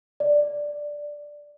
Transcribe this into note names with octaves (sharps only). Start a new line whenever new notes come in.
D5